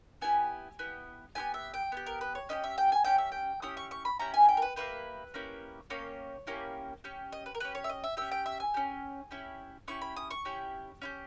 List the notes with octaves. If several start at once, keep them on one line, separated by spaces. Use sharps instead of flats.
B3 E4 G4 G#5
B3 E4 G4
B3 E4 G4 G#5
E5
G5
B3 E4 G4
A#4
B4
C#5
C#4 E4 G4 D#5
E5
G5
G#5
C#4 E4 G4 G5
E5
G5
C#4 E4 G4 D#6
C#6
C#6
B5
C#4 E4 G4 A#5
G#5
G5
A#4
B4
A#3 C#4 E4 G4 B4
A#3 C#4 E4 G4
A#3 C#4 G4 C#5
A#3 C#4 E4 G4
C#4 G4
D#5
B4
A#4
C#4 G4 B4
C#5
E5
D#5
E5
C#4 G4 E5
G5
E5
G#5
C#4 G4
C#4 E4 G4
C#4 E4 G4 C#6
B5
D#6
C#6
C#4 E4 G4
C#4 E4 G4